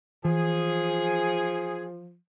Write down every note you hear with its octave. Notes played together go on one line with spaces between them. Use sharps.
E3 F3 G#4